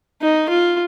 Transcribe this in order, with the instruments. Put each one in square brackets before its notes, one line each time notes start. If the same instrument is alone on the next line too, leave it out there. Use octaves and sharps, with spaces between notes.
[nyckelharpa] D#4
F4